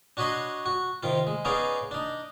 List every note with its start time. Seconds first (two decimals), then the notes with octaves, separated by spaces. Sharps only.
0.17 D4 F#4 C#5 D#5 B5 C6
0.66 F#4
1.03 C3 D#3 F4
1.27 G#3
1.45 B3 C#4 D#4 G#4 D5 F5
1.91 D4 D#4